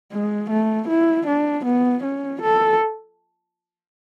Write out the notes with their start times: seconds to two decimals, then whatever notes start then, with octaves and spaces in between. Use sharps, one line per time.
0.12 G#3
0.50 A3
0.88 E4
1.27 D4
1.65 B3
2.03 C#4
2.42 A4